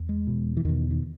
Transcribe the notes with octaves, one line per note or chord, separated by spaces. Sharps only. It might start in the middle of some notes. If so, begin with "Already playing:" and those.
Already playing: E2
G#3
E2 B2
E3
E2 B2 D#3
D#3